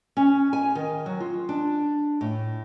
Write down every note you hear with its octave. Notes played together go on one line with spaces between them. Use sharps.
C#4
G#5
D#3
F#3
F4
D4
A2